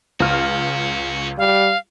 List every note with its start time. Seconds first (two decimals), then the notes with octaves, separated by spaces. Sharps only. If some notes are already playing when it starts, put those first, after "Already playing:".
0.20 C#2 C#4 F#4 F6
1.38 G3 F5